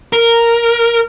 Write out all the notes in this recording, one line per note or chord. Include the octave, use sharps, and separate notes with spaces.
A#4